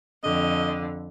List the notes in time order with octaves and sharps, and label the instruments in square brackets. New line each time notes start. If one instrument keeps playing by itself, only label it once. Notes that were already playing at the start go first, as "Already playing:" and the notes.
[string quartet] F2 D3 [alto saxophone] D#5